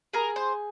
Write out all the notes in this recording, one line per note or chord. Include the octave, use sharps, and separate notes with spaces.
G#4 A#4
C5